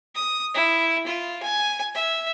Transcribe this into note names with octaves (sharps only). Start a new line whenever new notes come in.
D#6
E4
F4
G#5
E5